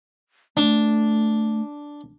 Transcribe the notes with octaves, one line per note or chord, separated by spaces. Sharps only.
A3 D4